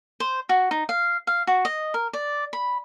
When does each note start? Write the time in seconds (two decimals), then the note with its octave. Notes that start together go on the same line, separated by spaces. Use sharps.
0.20 C5
0.49 F#4
0.71 D#4
0.89 F5
1.27 F5
1.47 F#4
1.65 D#5
1.94 A#4
2.13 D5
2.53 B5